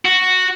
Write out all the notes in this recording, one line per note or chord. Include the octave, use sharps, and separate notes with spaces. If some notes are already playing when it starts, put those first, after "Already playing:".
F#4